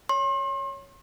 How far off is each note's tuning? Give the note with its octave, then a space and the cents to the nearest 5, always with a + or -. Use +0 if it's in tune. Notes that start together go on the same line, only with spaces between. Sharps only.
C#5 +10 C6 +40